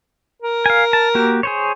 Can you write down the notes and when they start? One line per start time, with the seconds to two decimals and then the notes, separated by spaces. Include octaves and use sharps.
0.42 A#4
0.66 F5 G#5
0.93 A5
1.15 A#3 F#4 G4
1.43 G#4 C5 C#5